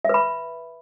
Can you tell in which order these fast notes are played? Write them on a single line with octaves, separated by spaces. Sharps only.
E5 B4 B5